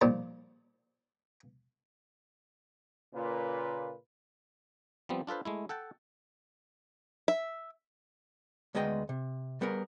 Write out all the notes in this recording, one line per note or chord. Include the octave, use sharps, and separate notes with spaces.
A#2 D#3 F3 G3 A#3
A#2 C#3 A#3 F4 B4
F3 G3 B3 C4
D4 F4 A4 B4 C5
G#3 A3 E4
A4 F#5 G5 A5
E5
D2 G#3 B3 D#5 G5
C3
G3 B3 G#4 A#4